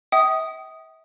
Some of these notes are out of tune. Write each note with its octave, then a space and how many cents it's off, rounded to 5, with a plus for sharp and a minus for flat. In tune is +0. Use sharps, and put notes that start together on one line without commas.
E5 -35 G5 -35 D#6 +0